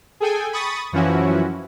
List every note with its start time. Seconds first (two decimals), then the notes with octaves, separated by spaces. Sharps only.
0.20 G#4 A4 G5 G#5
0.52 B5 C#6 D#6 A6
0.92 F#2 E3 F3 C#4 E4 F#4